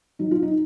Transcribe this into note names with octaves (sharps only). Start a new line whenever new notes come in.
F#3 D#4
F4
D#4